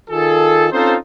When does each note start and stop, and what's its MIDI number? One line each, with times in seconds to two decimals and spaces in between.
0.10 0.67 51
0.10 0.67 65
0.10 0.67 68
0.10 0.67 69
0.72 0.95 60
0.72 0.95 61
0.72 0.95 63
0.72 0.95 65
0.72 0.95 69
0.72 0.95 72